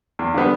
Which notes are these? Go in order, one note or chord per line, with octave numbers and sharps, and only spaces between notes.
E2
D3 G3 B3